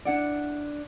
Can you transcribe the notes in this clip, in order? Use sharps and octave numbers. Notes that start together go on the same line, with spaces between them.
D4 E4 D5 F#5